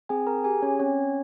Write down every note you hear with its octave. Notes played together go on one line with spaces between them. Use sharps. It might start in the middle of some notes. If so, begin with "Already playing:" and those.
C4 G#4 G#5
A#4 A#5
G4 G#4 G#5
C#4 C#5
C4 C#4 C#5